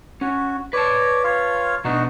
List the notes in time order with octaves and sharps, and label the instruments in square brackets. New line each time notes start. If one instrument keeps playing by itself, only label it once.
[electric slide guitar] C#4 [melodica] F#4
[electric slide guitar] B4 A5 [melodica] C#5 D5
[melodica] F4 C#5 F5
[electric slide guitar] B2 B3 D4 [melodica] D#4 F#4